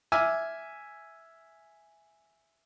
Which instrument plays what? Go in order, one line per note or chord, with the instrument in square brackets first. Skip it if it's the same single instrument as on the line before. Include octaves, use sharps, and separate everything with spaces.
[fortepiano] E5 G#5 D6 E6 F6